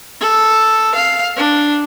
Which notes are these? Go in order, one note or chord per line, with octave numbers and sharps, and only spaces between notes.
A4
F5
D4